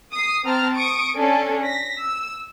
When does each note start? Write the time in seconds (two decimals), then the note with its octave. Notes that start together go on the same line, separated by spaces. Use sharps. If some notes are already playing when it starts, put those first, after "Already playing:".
0.13 D#6 C7
0.45 C4 A5 A#5 F6
0.76 C#6 D#6 D7
1.16 C#4 D4 A4
1.64 A#6 B6
2.01 E6